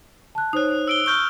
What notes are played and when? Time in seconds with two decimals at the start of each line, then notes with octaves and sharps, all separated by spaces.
0.35 A5 F#6
0.53 D#4 C5 C#5 D#6 F#6
0.88 E6 D7 G7
1.06 C#6 F6 G6 G7